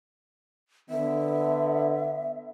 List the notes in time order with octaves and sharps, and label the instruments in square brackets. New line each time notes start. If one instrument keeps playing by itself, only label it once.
[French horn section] D3 B3 [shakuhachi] E5